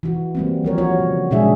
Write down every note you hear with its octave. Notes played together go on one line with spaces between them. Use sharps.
E3 F#4
G3 A#3 C4
D#3 F3 A#4 C#5
G3 F#4 C#5
C#3
A#2 C#3 G#3 D4 G#4 E5